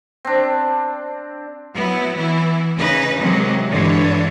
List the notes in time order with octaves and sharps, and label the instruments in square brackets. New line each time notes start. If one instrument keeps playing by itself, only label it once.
[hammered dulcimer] C4 D4
[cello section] F#3 B3 E4
E3 B3 E4
C#3 D#4 B4
C3 D#3 F#3 G#3
G2 D3 E3 G#3 D4 C#5